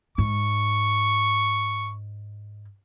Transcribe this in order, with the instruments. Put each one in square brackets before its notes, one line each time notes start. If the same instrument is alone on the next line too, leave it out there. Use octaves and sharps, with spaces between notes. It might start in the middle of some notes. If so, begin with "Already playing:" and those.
[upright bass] G#2 [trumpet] C#6